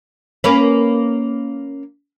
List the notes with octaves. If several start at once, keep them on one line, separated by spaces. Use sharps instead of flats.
A#3 C#4 B4